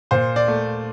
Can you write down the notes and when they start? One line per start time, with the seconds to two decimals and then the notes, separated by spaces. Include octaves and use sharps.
0.11 A#2 C5
0.36 D5
0.48 A3